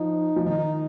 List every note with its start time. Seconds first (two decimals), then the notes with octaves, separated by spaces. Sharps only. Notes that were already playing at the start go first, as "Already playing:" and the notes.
Already playing: F3 D#4
0.36 F3
0.46 D#3 D#4